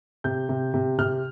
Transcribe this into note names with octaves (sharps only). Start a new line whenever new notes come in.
C3 G6
C3
C3
C3 F6